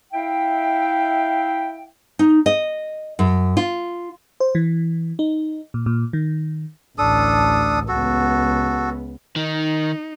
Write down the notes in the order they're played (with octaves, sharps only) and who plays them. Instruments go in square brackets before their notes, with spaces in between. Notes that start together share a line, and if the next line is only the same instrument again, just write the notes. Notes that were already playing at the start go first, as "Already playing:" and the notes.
[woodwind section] E4 E5 F5 G5
[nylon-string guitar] D#4
D#5
F#2
F4
[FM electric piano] C5
E3
D#4
A#2
A#2
D#3
[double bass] A1 D2 [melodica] D4 A4 D#6
[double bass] C#2 B3 [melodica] F#4 A4
[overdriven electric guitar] D#3 [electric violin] D#4